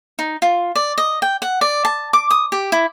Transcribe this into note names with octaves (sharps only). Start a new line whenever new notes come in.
D#4
F4
D5
D#5
G5
F#5
D5
A5
D6
D#6
G4
E4